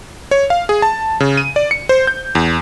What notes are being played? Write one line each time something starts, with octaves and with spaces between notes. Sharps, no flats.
C#5
F5
G#4
A5
C#3
D#7
D5
C#7
C5
G6
E2